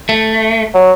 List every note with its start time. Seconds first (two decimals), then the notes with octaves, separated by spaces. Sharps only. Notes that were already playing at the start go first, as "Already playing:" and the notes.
0.09 A3
0.74 F#3